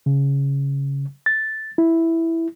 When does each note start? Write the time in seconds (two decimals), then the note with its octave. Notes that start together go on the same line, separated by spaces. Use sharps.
0.06 C#3
1.26 A6
1.78 E4